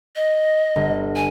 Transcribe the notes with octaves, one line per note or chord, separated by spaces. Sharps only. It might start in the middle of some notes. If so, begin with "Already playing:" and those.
D#5
G1
G#5